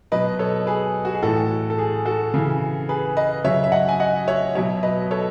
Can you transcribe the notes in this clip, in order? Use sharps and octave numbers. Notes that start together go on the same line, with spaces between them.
B2 F#3 B4 D#5
A4 C#5
G#4 B4
F#4
G#4
A2 E3 F#4 A4
A4
G#4
F#4 A4
C#3 E3
G#4 B4
B4 D#5
C#3 F#3 C#5 E5
E5
D#5 F#5
G#5
D#5 F#5
C#5 E5
B2 F#3 C#5 E5
B4 D#5
A4 C#5